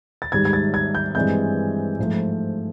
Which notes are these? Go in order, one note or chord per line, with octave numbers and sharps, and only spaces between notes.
A6
G#2 D#3 G3 G#6
G#6
A6
G#6
G6
G2 E3 G#3 C4 G6
G#2 F3 A3